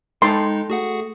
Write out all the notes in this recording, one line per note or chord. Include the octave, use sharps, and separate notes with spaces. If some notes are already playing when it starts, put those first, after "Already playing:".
G#3 D#4 A4 G5 A5 C6
A3 F#4 G#4 F#5